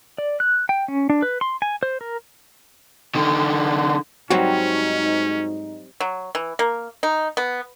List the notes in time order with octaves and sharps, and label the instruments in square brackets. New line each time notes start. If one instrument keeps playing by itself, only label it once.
[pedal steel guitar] D5
F#6
G5
C#4
D4
B4
C6
G#5
C5
A#4
[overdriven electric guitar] D3 D#3
[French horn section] G#2 D#4 [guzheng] F#3 G3 C4 [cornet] C#4 [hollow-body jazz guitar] F#4
[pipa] F#3
E3
A#3
D#4
B3